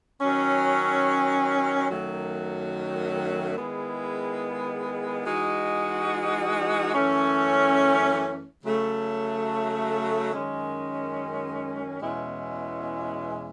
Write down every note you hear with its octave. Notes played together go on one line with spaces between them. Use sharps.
D#3 F#3 C#4
F#2 D#3 F#3 A3
D#3 G#3 B3 E4 G#4
E3 G#3 D#4 F#4
F#2 E3 A3 C#4
C#3 F#3 A3
F#2 D#3 G#3 C#4
E2 B2 G#3 C#4 E4